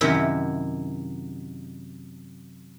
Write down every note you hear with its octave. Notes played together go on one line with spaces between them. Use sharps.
F#2 C3 D#3 E4